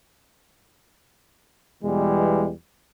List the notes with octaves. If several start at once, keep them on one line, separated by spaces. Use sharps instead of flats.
E2 B2 E3 G3 G#3